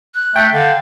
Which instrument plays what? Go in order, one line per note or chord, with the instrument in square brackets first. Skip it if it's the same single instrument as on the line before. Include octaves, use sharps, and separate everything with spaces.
[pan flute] F#6
[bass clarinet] A3 [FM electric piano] G5
[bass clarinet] D3 [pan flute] F5